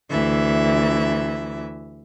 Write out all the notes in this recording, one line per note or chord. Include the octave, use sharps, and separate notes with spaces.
D2 E3 E5